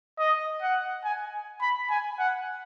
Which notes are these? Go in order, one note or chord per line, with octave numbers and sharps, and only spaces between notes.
D#5
F#5
G#5
B5
G#5
F#5